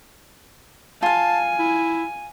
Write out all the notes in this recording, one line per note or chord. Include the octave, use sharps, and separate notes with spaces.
F4 F5 G#5 A5
E4